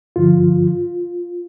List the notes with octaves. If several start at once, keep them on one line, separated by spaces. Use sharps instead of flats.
G2 D3 F3 F4